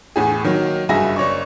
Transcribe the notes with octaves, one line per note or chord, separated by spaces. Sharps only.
E2 A2 G#4
D#3 F#3 A#3
F#1 G2 F#4 G#4 E5 A#6
F#1 C#5 D5 C#6